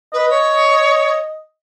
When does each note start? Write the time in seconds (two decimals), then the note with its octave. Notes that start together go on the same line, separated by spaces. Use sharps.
0.13 B4 D#5
0.29 C#5